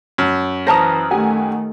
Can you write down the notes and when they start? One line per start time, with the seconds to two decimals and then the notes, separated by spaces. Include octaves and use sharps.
0.18 F#2
0.67 E3 C5 A5 A#5 D#6 F6 A#6
1.11 D#3 A3 G4 F#5 G#5